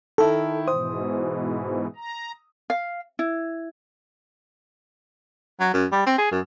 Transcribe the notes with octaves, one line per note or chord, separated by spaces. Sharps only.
D#3 E4 A4
G#2 B2 E3 C5 D#6
A#5
F5
E4
F#3
F#2
G3
C4
G#4
F#2